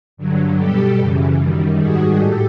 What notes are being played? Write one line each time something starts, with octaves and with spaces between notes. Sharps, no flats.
G2 D3 F#3
B2 G3 G4 A4
F#2 C#3 E3
F#2 D#3 G3
G#2 D#3 G3 F#4 G#4
A2 G4 A4